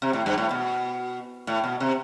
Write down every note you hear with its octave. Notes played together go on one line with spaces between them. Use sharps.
C3
A2
G2
A2
B2
A2
B2
C3